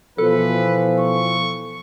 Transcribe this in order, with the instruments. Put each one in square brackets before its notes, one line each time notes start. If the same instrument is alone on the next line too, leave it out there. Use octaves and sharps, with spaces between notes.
[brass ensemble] B2 E3 F3 [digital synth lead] A4 [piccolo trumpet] B4
[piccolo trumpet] C#6